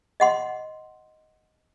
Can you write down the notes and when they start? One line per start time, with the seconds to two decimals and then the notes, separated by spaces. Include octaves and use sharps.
0.20 D#5 F#5 C6